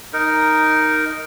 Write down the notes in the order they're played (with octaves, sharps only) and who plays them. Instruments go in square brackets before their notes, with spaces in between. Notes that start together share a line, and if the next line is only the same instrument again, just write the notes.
[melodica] D#4 A#4